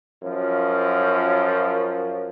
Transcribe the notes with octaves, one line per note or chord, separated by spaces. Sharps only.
F#2 F3 F4